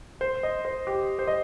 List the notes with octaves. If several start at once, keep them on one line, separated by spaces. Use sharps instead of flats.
C5
D#5
C5
G4
C5
D#5